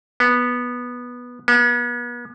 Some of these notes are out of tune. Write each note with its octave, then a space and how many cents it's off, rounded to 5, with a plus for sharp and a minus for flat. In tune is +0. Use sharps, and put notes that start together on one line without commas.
B3 -10
B3 -40